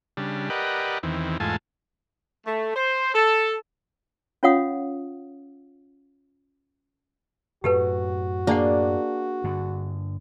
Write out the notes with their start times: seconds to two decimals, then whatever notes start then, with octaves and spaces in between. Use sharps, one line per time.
0.17 C#3 G3 D4
0.50 G4 A#4 B4 D5 D#5 F#5
1.03 E2 D#3 E3 C4
1.40 E2 G#2 A3 F4 G#5 A5
2.46 A3
2.76 C5
3.14 A4
4.43 C#4 F4 C#5 F5 F#5 D#6
7.64 F#2 A2 F#4 G4 A4 B4
8.47 A#3 D4 G#4 C5 D5 F#5
9.44 G2 D3